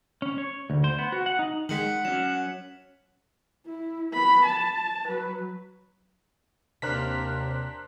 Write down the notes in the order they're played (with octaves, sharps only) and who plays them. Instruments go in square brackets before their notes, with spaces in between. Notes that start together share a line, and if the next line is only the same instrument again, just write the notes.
[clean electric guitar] C#4
C#5
D2
C5
B3
F#4
F#5
D#4
[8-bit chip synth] D#3 G#3 [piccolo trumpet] F#5 [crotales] B6 C#7 F#7
[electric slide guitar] F#3 C#4 [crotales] E7
[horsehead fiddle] E4
B3 B5
A5
F#3 B4
[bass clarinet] D#2 [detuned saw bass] C3 [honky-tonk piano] D4 A#4 C5 [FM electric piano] F6 F#6 B6